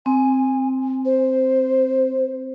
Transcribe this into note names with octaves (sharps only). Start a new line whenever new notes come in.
C4 G#5
C5